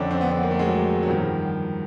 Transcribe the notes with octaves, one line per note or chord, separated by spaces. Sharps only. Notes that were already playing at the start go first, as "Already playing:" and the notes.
Already playing: F2 D3 C#4 D4
C4
B3
B3
A#3
A3
G#3
F#3
F#3
G2 D#3 F3